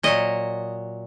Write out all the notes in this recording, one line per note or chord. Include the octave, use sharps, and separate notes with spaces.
A#2 F#3 D#5